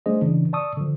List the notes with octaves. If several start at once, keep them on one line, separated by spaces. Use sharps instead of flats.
G3 A3 D4 G#4 C5 D#5
C#3 E3 D4
D5 A5 C#6 D#6 E6
D3 F3